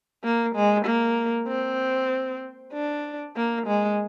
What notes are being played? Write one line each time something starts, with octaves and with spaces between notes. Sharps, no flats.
A#3
G#3
A#3
C4
D4
A#3
G#3